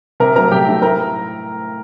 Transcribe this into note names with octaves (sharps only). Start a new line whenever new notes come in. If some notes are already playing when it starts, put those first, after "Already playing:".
C3 A#4 A#5
F#3 A3 A#4 A#5
C3 G4 G5
F#3 A3
A2 A#4 A#5